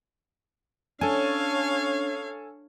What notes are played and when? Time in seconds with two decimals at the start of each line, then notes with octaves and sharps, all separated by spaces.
1.01 C#4 D4 A4 C#5 F5 G#5